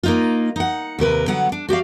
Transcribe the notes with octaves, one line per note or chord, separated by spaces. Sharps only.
A#3 D#4 F4
D#4 F#5
D#2 C3 A#4 B4
D3 F#3 B3 F#5
D4
F#4 G4 D5 F5